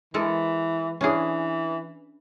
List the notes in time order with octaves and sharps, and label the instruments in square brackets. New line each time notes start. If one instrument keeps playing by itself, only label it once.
[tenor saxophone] E3 [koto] G#3 A4 A#4
[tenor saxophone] E3 [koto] C#4 D4 G#4